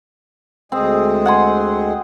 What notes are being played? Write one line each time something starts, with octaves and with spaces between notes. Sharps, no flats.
D2 G#3 C4 G#4
F#5 G#5 C6